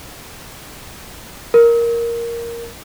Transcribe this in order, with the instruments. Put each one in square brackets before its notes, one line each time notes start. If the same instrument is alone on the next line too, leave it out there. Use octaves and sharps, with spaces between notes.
[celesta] A#4